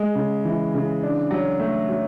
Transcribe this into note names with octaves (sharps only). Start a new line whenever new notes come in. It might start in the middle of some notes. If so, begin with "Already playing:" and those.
Already playing: G#3
C#3
E3
C#3
D4
F#3
A3
F#3